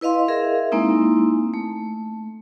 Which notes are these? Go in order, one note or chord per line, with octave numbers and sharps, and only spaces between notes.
E4 B4 D#5 F5 C6
G#4 A#4 E5 F5
G#3 A#3 C4 D#4 E4
A3